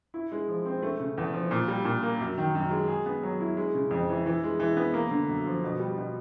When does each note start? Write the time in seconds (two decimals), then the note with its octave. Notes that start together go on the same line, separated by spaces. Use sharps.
0.14 E4
0.32 G#3
0.48 F3
0.66 C4
0.82 A3
1.00 C#3
1.18 E2
1.34 F3
1.51 A#2
1.68 G3
1.85 A#2
2.03 A#3
2.20 F#2
2.38 D#3
2.55 F#2
2.71 G#3
2.88 G#4
3.06 B3
3.23 F#3
3.40 E4
3.57 G#3
3.74 C#3
3.91 F2
4.09 E3
4.26 E3
4.44 G#3
4.60 E3
4.77 B3
4.94 A#3
5.11 D3
5.29 F#2
5.46 F3
5.64 B2
5.80 G3
5.98 B2